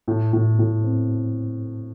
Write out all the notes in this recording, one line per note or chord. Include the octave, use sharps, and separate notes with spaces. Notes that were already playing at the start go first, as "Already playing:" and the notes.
A2
A2
A2
C4